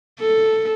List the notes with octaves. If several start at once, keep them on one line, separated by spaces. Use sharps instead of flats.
A4